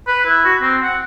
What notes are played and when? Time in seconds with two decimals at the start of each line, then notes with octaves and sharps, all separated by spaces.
0.07 B4
0.26 E4
0.45 F#4
0.61 C4
0.83 F#5